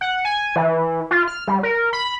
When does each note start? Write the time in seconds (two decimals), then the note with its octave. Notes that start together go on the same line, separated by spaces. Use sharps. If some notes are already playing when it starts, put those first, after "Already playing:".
0.01 F#5
0.25 G#5
0.56 E3
1.11 F4
1.28 F6
1.48 G3
1.63 A#4
1.93 B5